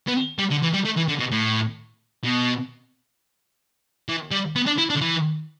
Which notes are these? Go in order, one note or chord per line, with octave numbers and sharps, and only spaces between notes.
B3
G3
D3
E3
G3
A3
E3
D3
B2
A2
B2
E3
G3
B3
D4
E4
D4
D3
E3